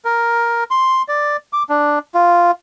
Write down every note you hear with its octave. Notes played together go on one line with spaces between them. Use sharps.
A#4
C6
D5
D6
D4
F4